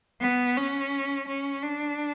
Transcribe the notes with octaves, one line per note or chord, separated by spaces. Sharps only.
B3
C#4
C#4
D4